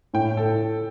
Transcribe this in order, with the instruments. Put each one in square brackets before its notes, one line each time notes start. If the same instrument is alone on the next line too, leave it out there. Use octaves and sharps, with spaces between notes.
[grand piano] A2 [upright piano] G5
[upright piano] A4